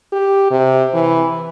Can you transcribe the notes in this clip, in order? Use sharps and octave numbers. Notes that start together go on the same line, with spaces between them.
G4
C3
E3